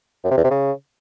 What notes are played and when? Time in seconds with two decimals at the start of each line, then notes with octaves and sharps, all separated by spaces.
0.24 F#2
0.31 C3
0.37 E2
0.44 C3
0.50 C#3